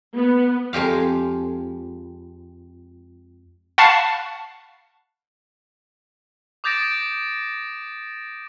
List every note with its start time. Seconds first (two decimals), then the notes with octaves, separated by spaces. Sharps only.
0.14 B3
0.73 F2 G#3 G4 F5
3.78 F5 F#5 A5 B5 C#6 C7
6.64 D6 D#6 G6 A6 A#6 D7